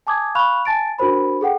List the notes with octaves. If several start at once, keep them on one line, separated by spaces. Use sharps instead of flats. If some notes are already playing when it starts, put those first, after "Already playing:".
G#5 A5 D6 D#6 G#6
F5 B5 C#6 F6 F#6 F7
G#5 A5 A6 D7
D4 F#4 A#4 C5 B5
G#4 A4 F#5 G5